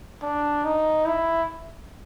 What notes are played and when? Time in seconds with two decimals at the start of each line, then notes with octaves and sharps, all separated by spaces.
0.22 D4
0.65 D#4
1.06 E4